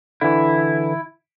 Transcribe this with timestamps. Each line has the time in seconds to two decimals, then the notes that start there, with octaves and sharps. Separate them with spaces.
0.21 D3 E3 E4